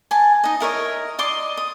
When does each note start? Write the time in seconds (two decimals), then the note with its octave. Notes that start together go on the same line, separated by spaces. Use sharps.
0.11 G#5 A5
0.44 D#4 D#5
0.60 E4 A#4 C#5 D#5
1.19 D5 D#5 C6 D6
1.57 D#6